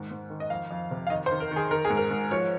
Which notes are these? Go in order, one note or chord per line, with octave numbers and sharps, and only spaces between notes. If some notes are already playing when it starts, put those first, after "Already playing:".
Already playing: G#2 D#3
G#2
D#3
D#5
F2 F5
F2
C3
F5
D#3 D#5
C5
D#3
A#4
D#3
G#4
D#3 A#4
G#4
G#2
A#4
G#2
F3 C#5